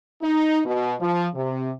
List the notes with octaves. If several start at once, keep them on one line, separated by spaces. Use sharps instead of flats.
D#4
B2
F3
C3